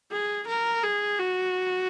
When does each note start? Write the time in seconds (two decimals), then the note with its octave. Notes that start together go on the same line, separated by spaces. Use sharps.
0.11 G#4
0.48 A#4
0.83 G#4
1.19 F#4